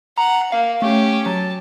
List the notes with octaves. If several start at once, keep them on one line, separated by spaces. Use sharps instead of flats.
F#5 A#5
A#3 F5
A3 C#4 G4
F#3 A5